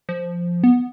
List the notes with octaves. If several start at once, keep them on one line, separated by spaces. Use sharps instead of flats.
F3
B3